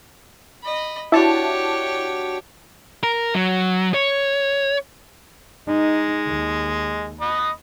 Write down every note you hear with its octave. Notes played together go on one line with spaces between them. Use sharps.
D#5 B5
D4 E4 F#4 G4 C#5 A5
A#4
F#3
C#5
G#3 D#4
D#2
D#5 B5 D#6